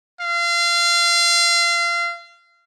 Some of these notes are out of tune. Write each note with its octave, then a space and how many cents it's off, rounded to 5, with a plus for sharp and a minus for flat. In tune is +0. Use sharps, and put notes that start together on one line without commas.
F5 -25